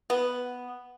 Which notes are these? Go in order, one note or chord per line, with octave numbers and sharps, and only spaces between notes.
B3